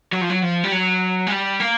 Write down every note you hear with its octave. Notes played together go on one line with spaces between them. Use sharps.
F#3
F3
F#3
F3
G3
F#3
G#3
G3
A#3